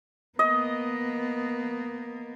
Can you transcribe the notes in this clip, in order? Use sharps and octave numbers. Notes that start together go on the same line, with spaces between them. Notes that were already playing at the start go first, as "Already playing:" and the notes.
A#3 B3 D#5